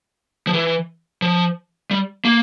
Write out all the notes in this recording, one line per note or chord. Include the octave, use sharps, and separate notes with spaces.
F3
E3
F3
G3
A#3